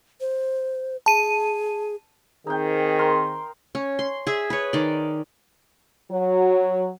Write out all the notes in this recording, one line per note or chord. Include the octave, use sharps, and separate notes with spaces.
C5
G#4 A5 D#7
D#3 C4 D#4 G#4 G5
A#4 C6
C#4
C6
G#4 E5
B4 C#5
D#3 D5
F#3